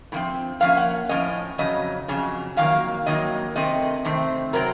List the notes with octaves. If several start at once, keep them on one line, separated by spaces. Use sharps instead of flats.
A2 F3 C4
A2 F3 A#3 C#4 F5
F#5
A2 F3 A#3 C#4 D#5
F2 C#3 F#3 D#5
F2 C#3 F#3
F2 D#3 F#3 A#3 F5
F2 D#3 F#3 A#3 D#5
C3 D#3 A3 C4 D#5
C3 D#3 A3 C4
C3 F#3 C4 A#4